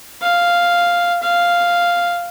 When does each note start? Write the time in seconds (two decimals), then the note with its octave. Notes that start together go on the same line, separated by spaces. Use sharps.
0.22 F5
1.22 F5